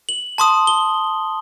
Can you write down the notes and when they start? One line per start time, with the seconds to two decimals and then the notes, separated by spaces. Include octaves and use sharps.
0.09 F#7
0.38 A5 C6 D#6
0.67 G7